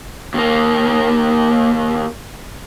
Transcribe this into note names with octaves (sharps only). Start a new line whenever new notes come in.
D#2 A#3